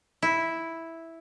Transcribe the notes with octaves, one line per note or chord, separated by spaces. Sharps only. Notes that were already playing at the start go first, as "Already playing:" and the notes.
E4